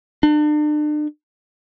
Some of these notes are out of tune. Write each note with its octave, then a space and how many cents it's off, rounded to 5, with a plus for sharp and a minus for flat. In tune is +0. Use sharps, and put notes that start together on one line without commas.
D4 +40